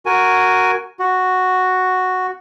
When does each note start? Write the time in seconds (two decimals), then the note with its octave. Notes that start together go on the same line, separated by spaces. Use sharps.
0.06 F#4 A#4 G#5
0.99 F#4